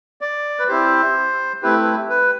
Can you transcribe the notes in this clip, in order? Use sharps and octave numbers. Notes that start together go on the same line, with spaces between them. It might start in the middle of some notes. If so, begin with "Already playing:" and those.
D5
B4
C4 E4 G4 C5
A3 C4 E4 G4 B4
B4
B4